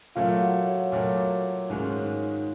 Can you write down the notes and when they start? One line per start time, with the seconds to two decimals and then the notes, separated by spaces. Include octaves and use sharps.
0.15 A#2 F#3 A3 F4 F5
0.42 F#4 F#5
0.67 C#5
0.92 A#2 F#3 A3
1.70 G#2 D#3 G#3 C#4